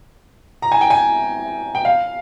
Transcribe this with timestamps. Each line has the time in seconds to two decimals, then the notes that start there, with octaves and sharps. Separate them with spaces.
0.62 A#5
0.72 G#5
0.81 G5
0.90 G#5
1.75 G5
1.85 F5